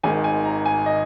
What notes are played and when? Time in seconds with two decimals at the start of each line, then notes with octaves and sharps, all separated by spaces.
0.03 G#1 G#2 D#3 G#5
0.24 G#5
0.45 A#5
0.66 G#5
0.86 D#5